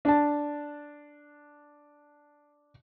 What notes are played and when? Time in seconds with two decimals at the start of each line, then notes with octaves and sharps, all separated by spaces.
0.05 D4 A5